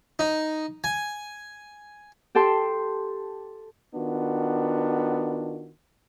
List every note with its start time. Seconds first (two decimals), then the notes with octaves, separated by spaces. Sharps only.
0.19 D#4
0.84 G#5
2.35 G4 A4 G5 A5 C6
3.94 D#3 B3 D4 F4 F#4